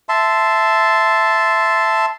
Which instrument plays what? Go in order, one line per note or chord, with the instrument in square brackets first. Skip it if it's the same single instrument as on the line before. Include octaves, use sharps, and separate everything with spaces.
[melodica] E5 A5 C6